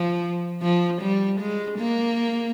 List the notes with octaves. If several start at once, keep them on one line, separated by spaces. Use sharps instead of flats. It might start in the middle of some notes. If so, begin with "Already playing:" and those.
Already playing: F3
F3
G3
G#3
A#3